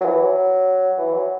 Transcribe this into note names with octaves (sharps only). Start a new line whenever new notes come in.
F#3
E3
F#3
E3
F#3